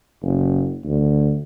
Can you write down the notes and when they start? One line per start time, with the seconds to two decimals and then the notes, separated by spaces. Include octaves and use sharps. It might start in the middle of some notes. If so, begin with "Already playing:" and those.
0.22 F#1
0.84 D2